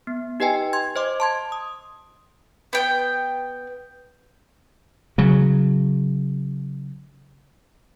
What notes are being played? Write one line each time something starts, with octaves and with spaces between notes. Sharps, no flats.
B3
D#4 G4 B4 D#5 G5 G#5
C6 G#6
C5 D#5 C6 D6
A5 C6 G#6
D#6
B3 G5
C#3 F#3